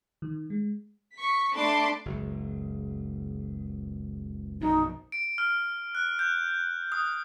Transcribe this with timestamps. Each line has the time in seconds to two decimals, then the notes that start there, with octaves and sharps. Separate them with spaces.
0.22 D#3
0.50 G#3
1.13 C#6 B6
1.54 A3 D4 A5 B5 C6 D6
2.06 F#1 C#2
4.61 A#1 F#2 B2 D#4
5.12 D7
5.38 F6
5.95 F#6
6.19 G6
6.92 D#6